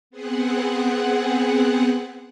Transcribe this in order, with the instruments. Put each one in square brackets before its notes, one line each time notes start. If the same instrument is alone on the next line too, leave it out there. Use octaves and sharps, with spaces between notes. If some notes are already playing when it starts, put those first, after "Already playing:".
[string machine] B3 C4 G#4 F#5